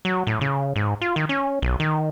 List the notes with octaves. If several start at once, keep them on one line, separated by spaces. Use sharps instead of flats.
F#3
A2
C#3
G#2
F4
D#3
C#4
B1
D#3